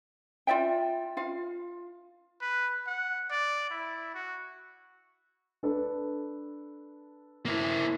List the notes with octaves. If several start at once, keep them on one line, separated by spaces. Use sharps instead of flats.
F4 D5 E5 G5
F4 F5
B4
F#5
D5
E4
F#4
D4 A4 B4
A#3 E4